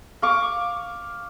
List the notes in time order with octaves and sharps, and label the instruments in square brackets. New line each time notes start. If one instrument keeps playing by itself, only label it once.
[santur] F5 C#6 D6